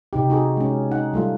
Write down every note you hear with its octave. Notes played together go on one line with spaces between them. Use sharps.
C3 D#4 G4
D#4 F#4 G#4
G#3 C#4
D#4 F#5
G3 A3 F4